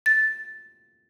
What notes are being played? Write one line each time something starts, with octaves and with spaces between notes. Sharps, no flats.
A6